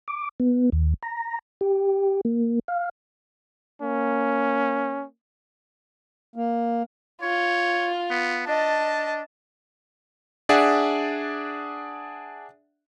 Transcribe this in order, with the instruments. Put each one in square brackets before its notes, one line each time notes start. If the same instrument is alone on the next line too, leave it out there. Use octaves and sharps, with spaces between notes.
[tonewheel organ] D6
B3
D#2
A#5
G4
A#3
F5
[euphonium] A#3 [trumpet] C#4
[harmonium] A#3
[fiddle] F4 [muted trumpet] C#5
[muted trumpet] B3
[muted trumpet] D4 [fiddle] D#5 A5
[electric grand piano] D4 G#4 D5 E5 F#5